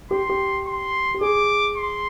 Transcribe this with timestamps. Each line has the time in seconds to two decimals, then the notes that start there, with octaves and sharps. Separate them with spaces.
0.11 G4 C6
0.29 G4
0.67 C6
1.14 G4
1.21 G#4 D6
1.77 C6